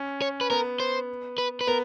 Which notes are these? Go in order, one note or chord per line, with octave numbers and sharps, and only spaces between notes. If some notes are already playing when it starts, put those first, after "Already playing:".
Already playing: C#4
C#5
B4
B3 A#4
C5
B4
B4
B3 A#4